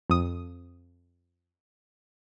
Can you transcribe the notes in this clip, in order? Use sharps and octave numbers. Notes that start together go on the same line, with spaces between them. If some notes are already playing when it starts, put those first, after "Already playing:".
F2 D#6